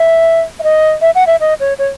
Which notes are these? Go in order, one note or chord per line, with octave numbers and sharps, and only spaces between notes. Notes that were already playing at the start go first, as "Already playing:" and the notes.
Already playing: E5
E5
D#5
E5
F#5
E5
D#5
C#5
C#5